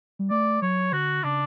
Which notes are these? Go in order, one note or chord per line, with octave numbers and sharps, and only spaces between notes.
G3
A3 D5
F#3 C#5
D3 F#4
C#3 D4